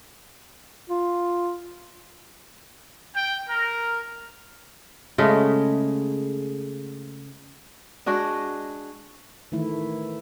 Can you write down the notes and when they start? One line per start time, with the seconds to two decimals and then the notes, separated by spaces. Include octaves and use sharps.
0.90 F4
3.16 G5
3.49 A#4
5.18 C#3 G#3 A3
8.06 G#3 D4 F#4 D#5
9.52 D#3 E3 A3 E4